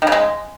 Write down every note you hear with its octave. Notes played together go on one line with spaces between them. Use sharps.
D#3
C#3
G#3